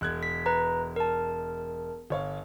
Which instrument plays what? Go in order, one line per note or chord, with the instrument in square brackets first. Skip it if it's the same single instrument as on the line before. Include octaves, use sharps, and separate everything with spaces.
[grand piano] E1 F#6 G#6
[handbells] B6
B4 A#5
A#4 A5
[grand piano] G1 C#5 F5